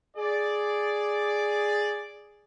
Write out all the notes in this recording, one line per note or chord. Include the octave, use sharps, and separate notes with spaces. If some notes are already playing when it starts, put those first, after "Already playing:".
G#4 D5